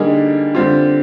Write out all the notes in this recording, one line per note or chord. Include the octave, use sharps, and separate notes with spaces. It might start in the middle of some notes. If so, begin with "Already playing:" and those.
Already playing: D3 G3 A#3 D#4 G#4
D3 G3 C4 F4